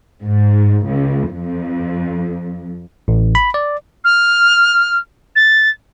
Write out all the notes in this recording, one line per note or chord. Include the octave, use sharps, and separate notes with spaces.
G#2
C#2
F2
A1
B5
D5
F6
A6